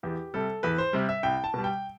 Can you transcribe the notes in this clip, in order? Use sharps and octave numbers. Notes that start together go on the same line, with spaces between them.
E2 G4
C3 G3 A4
E2 B4
C5
C3 G3
E5
C2 G5
A5
B2 G3
G5